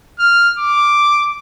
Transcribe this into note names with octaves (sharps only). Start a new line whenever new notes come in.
F6
D6